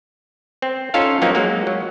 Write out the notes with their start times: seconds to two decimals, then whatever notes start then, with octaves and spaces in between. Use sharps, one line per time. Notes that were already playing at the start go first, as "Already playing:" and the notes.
0.62 C4
0.94 C#4 D#4 F4 A4 F5
1.22 F3 F#3 A#3 C4 C#4 D#4
1.35 F#3 G#3 A#3
1.67 F#3